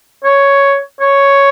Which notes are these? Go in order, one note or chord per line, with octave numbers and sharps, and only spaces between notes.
C#5
C#5